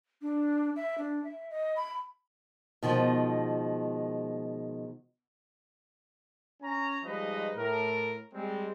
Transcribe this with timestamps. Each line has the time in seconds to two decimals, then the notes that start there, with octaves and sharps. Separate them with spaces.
0.22 D4
0.76 E5
0.98 D4
1.24 E5
1.50 D#5
1.76 B5
2.83 B2 D#3 F3 G#3
6.62 C#4 G#5 A#5
7.04 F3 G3 G#3 D#4 B4 D#5
7.56 A2 A#4
8.34 G3 G#3 C4